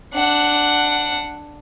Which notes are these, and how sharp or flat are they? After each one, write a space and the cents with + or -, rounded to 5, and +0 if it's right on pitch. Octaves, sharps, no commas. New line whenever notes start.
D4 +5 F#5 +0